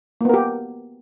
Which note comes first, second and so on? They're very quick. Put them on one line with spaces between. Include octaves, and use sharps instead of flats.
A#3 B3 A#4 G4